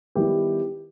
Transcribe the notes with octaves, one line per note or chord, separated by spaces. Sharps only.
D#3 G3 B3 E4 G4